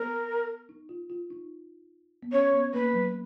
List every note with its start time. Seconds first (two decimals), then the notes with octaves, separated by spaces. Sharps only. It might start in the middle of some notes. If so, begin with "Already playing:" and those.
Already playing: B3 A#4
0.69 D#4
0.89 F4
1.10 F4
1.30 D#4
2.23 B3
2.32 C#4 C#5
2.53 B3
2.73 A#3 B4
2.94 F#3